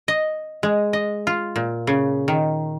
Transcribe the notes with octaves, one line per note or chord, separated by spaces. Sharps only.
D#5
G#3
D#5
F4
A#2
C#3
D#3